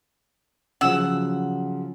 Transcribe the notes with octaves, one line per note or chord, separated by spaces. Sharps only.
C#3 F3 F#3 F#5 E6